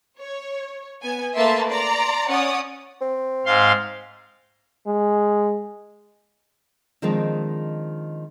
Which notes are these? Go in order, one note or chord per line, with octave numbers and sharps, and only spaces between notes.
C#5
B3 G#5
A3 A#3 B4 E5 A5 C6
D5 A#5 C6
C#4 C#5 D5 F#5 D#6
C4
G#2 F5 C6
G#3
D#3 F3 G#3 C4 D4 D#4